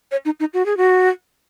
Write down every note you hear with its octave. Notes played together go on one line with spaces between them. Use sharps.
C#5
D#4
D#4
F#4
G#4
F#4